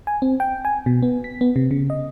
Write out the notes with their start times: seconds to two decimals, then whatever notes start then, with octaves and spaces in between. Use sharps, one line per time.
0.07 G#5
0.22 C4
0.40 G5
0.65 G#5
0.86 B2
1.02 B3
1.24 B6
1.41 B3
1.56 C3
1.71 C#3
1.90 D#5